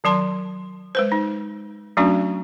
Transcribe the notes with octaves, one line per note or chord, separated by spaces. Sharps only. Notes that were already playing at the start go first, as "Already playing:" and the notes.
D#3 F#3 A5 C6
G#3 B4 C5
D#4
F#3 A3 C#4 D4 F#4